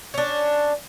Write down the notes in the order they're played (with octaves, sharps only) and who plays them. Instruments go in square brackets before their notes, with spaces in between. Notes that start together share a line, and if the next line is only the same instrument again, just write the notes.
[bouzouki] C#4 D4